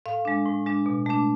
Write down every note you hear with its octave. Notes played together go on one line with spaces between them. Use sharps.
A2 F5
G#3 D4
A2
G#3 D4
B2
A3 D4